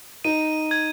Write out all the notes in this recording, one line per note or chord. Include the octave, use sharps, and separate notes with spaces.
D#4 D#7
G#6